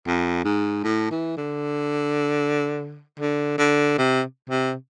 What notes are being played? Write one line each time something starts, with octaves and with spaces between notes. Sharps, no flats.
F2
G#2
A2
E3
D3
D3
D3
C3
C3